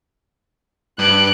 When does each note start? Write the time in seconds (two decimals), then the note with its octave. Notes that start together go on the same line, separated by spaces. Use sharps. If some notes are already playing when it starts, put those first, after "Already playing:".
0.99 G2 F#6 D7